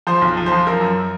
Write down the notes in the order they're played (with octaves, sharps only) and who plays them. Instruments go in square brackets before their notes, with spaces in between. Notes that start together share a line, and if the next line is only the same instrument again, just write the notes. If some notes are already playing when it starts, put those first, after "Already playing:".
[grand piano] F3 C5
B1
F3
C5
F3
F#2 A#4
F#2